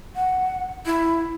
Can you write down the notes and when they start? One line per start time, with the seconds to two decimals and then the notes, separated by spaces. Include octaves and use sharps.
0.15 F#5
0.86 E4